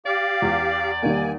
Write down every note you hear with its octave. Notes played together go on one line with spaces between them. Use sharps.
G4 D5 F5
E2
D#3 G3 A#3 G#5